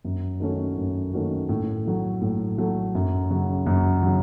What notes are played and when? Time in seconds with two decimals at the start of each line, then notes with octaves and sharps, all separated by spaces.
0.05 F#2
0.40 D#3 A3 C#4 F#4
0.77 F#2
1.13 D#3 A3 C#4 F#4
1.49 A2
1.85 F#3 A3
2.21 A2
2.58 F#3 A3
2.95 F#2
3.31 C#3 F#3
3.66 F#2
4.03 C#3 F#3